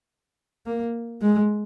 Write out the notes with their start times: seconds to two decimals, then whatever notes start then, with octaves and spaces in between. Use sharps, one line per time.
0.66 A#3
1.21 G#3